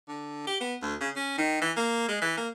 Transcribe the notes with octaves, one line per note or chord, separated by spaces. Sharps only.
D3
G4
B3
D2
C#3
C#4
D#3
E3
A#3
G#3
E3
A#3